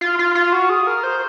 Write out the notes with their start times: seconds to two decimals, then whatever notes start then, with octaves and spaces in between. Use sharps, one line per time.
0.01 F4
0.19 F4
0.35 F4
0.53 F#4
0.69 G#4
0.87 A#4
1.03 C5